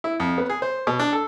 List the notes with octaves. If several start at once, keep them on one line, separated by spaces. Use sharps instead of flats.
E4
F2
B3
G#4
C5
B2
D4
A4